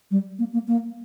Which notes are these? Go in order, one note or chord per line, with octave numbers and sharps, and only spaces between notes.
G3
A#3
A#3
A#3